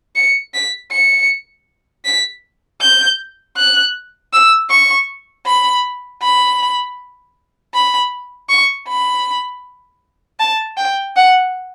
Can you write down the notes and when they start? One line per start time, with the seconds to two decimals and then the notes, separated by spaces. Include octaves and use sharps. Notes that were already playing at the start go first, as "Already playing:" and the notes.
0.16 C#7
0.54 B6
0.92 C#7
2.05 B6
2.81 G6
3.57 F#6
4.33 E6
4.70 C#6
5.47 B5
6.22 B5
7.74 B5
8.50 C#6
8.89 B5
10.40 A5
10.78 G5
11.16 F#5